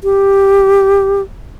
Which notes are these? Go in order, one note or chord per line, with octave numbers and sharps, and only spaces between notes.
G4